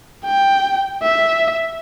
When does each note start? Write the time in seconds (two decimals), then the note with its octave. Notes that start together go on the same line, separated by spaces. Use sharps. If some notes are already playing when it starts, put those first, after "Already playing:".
0.25 G5
1.02 E5